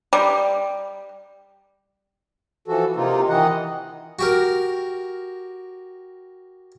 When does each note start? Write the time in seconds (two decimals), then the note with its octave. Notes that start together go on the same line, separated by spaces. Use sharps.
0.13 G3
2.68 E3 F3 F#4 A4
2.96 C3 A#3 D#4 F4
3.29 D#3 E3 D#5 F#5
4.19 F#4 G4 A#4